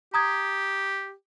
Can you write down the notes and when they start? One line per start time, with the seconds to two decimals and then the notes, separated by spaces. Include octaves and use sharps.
0.14 G4 A#5 D#6 G#6